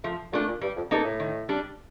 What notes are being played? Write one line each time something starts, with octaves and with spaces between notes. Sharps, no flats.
F3 A3
A#2 A3 D4
A#2
G2 G3
F2
G2 A#3 D#4 A4
A2
D#3
G3 D4